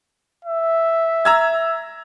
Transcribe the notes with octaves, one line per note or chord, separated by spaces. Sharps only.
E5
A#5 E6 G#6